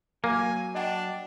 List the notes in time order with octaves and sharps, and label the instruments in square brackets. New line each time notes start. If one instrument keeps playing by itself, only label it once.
[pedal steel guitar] F#3 [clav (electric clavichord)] A#3 [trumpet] G#5
[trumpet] D4 [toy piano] D#5 F#5 G5